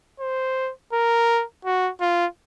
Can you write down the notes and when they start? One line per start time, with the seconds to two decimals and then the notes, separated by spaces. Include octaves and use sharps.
0.20 C5
0.93 A#4
1.65 F#4
2.01 F4